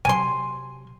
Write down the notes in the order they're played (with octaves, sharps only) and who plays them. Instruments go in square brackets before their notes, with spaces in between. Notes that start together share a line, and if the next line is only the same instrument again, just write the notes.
[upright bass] C3 F#3 [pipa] G#5 C6